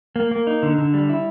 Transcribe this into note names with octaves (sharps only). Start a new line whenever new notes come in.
A#3
A#3
D#4
D3
D3
G3
E4